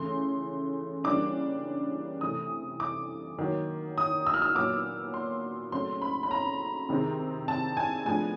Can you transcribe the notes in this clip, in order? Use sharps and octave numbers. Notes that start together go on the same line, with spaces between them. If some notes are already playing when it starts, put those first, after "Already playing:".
Already playing: C#3 E3 A3 C6
C#3 E3 G3 A#3 D4 D6
C3 E3 A3 C4 D#6
D6
D#3 F#3 A#3
D#6
E6
F6
E6
A#2 F#3 B3 D6
C6
C#3 F#3 A3 C4 C6
B5
B5
A#5
C3 D#3 G#3 C4
A5
G#5
A2 F3 G#3 B3 D4 G#5